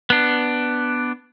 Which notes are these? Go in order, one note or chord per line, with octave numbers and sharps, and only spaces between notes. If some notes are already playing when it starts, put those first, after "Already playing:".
B3 D4